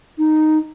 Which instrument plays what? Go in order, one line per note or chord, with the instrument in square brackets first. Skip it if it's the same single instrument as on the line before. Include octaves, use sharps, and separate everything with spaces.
[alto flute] D#4